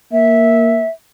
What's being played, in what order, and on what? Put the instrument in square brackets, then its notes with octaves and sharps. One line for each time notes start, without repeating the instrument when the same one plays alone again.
[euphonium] A#3 [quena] E5